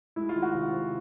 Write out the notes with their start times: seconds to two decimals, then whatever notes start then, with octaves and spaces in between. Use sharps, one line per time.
0.16 G#3 E4
0.29 F4
0.36 D#3
0.42 F#4
0.54 C3
0.73 C3